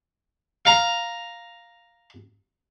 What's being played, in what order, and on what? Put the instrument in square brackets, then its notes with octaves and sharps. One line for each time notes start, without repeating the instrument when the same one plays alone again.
[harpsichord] F5 A#5